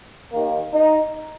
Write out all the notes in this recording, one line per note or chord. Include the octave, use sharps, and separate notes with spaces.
D#2 D#3 A#3
D#4